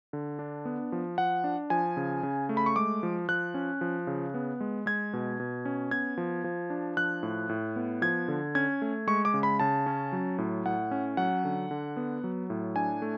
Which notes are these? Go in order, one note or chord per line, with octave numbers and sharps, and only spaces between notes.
D3
D4
B3
F3
F3 F#5
D4
F3 G#5
C#3
C#3
A3
B5
C#6
G#3 D6
F3
F3 F#6
C#4
F3
C#3
B3
G#3
G#3 G#6
B2
B2
C#4
B3 G#6
F3
F3
D4
F3 F#6
A2
A2
B3
F3 G#6
D3
C#4 G#6
A3
G#3 C#6
D6
C#3
B5
C#3 A5
C#4
F#3
A2
A2 F#5
C#4
F#3 F#5
D3
D3
B3
F#3
A2
D4 G#5
A3